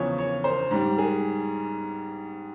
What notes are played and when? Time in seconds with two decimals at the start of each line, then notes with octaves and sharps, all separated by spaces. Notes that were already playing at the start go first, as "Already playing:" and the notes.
Already playing: E2 C#3 F3 C#5
0.18 C#5
0.44 C5
0.71 G#2 G3
0.98 G#4